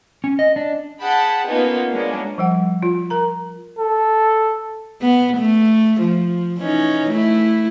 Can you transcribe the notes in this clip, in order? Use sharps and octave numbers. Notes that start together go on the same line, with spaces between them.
C#4
D#5
D4
G#4 F#5 G5 A5 B5
A#3 B3 C#4 D#4 F4
G#3 A#3 B3 C#4 D4
F3 G3 F#5
F4
A#4 A#5
A4
B3
A3
F3
E3 C#4 D#4
A3 E4